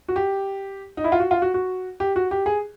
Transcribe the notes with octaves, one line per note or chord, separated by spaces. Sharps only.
F#4
G4
D#4
E4
F4
F#4
F4
F#4
F#4
G4
F#4
G4
G#4